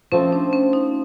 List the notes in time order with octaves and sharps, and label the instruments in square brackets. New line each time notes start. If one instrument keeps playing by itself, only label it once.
[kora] F3 A3 C4 [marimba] C#4
[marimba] D4
C#4
D#4